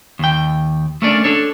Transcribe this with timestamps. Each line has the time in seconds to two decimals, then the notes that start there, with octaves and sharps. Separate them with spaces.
0.19 D#2 G5
1.02 A3 A#3 C#4 D4 D5
1.24 D4 A4 C#5